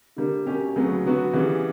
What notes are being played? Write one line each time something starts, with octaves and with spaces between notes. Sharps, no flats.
D3 G3 A#3
B2 A#3 C#4 G4
D2 C#3 F#3 B3
D3 F#3 B3 F#4 B4
C#3 E3 G3 B3